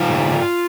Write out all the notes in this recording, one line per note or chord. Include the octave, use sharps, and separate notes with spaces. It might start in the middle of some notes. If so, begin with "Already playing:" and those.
Already playing: D#3 F4
G#2